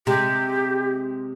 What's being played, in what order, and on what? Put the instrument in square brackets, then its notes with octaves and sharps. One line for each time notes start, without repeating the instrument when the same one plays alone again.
[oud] C3 G#3 [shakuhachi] G4